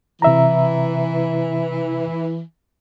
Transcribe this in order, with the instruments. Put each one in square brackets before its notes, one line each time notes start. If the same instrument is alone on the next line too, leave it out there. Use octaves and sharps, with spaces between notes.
[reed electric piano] C3 E5 A#5 [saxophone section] E3